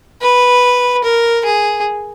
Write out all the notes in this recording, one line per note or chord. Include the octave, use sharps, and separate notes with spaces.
B4
A#4
G#4